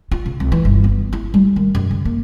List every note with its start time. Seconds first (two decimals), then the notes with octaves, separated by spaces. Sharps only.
0.12 F4
0.26 C#3
0.40 C2
0.52 E3
0.65 G1
0.84 B3
1.13 E4
1.34 G3
1.56 D#3
1.75 F#2
1.91 C#3
2.05 A#3